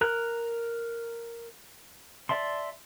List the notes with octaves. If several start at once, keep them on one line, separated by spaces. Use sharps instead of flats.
A#4 A#5 F#6
D5 E5 A5 C6